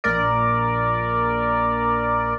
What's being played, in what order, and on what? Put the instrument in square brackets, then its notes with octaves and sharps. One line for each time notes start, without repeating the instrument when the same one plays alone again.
[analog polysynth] A#1 A#4 D5